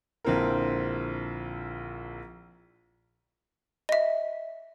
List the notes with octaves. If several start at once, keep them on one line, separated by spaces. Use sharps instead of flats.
A#1 D3 C4 E4 A#4
D#5 E5